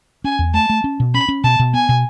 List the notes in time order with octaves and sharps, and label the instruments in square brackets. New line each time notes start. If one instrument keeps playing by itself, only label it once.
[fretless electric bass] C#4 [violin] G#5
[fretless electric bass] E2
[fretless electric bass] A3 [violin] A5
[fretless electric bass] A3
C#4
B2
[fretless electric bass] C#4 [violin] B5
[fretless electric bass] C#4
[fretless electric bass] B2 [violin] A5
[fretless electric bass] B2
[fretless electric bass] B3 [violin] G#5
[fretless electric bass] B2